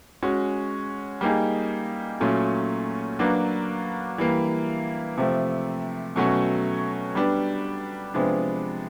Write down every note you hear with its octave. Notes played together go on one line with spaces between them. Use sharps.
G#3 C#4 F#4
G3 A#3 D#4 G#4
A#2 F#3 A3 C#4 F#4
F#3 A#3 D4 F#4 B4
E3 G3 A#3
C3 F3 A3
B2 F#3 A3 C#4 F#4
G3 B3 D4
C3 F3 G#3 B3 D4